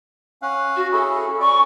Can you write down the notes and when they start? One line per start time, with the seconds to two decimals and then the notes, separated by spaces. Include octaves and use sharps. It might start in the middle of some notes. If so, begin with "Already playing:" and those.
0.42 C#4 F5 F#5
0.76 F#4
0.92 C#4 E4 G#4 A4
1.40 C#4 D5 C#6